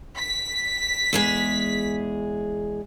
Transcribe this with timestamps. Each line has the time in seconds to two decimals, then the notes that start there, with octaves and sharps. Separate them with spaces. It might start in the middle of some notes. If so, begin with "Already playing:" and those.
0.17 B6
1.13 E2 G#3 G#4